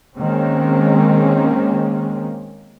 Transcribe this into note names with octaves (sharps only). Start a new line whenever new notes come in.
D#3 G#3 A#3 C4 C#4